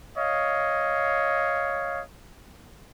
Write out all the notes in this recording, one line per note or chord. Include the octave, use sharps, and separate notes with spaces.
C#5 D#5 F5